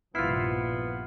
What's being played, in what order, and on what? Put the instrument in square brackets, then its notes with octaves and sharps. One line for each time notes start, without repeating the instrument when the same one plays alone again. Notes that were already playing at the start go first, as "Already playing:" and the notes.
[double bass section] A#1 G2 C3 [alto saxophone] B3 [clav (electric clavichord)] E4 F4 [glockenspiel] F6 C7